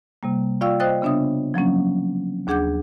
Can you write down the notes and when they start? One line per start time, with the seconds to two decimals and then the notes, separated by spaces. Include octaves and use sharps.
0.23 C3 G3 A#3
0.61 F4 D5 F5 G5 C#6 E6
0.80 C5 D#5 G5 D#6 F#6 A6
1.02 C#3 B3 D4 E5 D#6
1.54 F3 F#3 A#3 C#4
2.47 D#2 D4 G#4 F#5 D6 G6